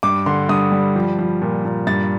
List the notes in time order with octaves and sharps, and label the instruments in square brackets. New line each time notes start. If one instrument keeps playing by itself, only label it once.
[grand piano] G2 D6
D3 C6
G2 D#6
G3
F3
F3
A#2
A#2
G2 A6